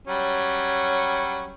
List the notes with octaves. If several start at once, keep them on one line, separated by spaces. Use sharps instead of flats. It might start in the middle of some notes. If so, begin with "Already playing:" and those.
F#3 G3 C#4